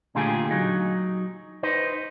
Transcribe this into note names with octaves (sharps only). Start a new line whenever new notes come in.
A#2 D3 A3 F4 G4 G#4
F#3 D#4
D#4 B4 C5